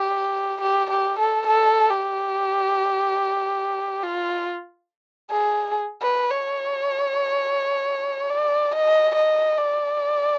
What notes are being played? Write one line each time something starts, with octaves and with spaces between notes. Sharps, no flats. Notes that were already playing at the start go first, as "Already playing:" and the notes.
Already playing: G4
G4
G4
A4
A4
G4
F4
G#4
B4
C#5
D5
D#5
D#5
D5